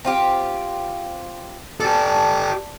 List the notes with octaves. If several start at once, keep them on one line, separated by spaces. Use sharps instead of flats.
C4 F4 G4
D4 G4 A4